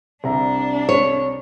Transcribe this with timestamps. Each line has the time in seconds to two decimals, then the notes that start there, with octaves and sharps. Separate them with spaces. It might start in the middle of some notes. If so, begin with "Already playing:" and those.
0.24 C2 D4 E5 A#5
0.89 C#5